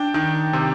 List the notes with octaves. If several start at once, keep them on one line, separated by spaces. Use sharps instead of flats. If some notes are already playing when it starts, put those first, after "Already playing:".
Already playing: D4 G5
D#3
C3